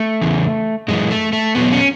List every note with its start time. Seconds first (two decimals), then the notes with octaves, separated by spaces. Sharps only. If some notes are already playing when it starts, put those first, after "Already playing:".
Already playing: A3
0.21 E2 C#3 E3
0.88 F#2 E3 G#3
1.11 A3
1.33 A3
1.55 E2 B2 F#3 B3
1.72 C#4